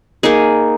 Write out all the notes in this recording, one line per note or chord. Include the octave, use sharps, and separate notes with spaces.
A#3 D#4 G#4